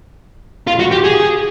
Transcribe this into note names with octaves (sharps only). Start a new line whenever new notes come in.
F4
F#4
G4
G#4